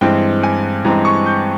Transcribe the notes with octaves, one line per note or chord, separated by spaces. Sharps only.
G2 E3 G#3 C4 G5
G#5
G2 E3 G#3 C4 A#5
C#6
G6